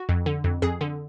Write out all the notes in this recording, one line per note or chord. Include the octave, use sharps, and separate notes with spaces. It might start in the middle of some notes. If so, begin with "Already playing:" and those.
Already playing: F#4
F2
D3
F2
F2 G#4
D3